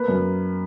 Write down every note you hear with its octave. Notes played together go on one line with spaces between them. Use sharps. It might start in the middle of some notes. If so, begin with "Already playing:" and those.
Already playing: A#3 B4
F#2